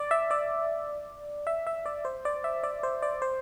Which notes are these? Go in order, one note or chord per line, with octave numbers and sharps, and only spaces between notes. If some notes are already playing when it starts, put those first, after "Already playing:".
Already playing: D5
E5
D5
E5
E5
D5
C5
D5
E5
D5
C5
D5
C5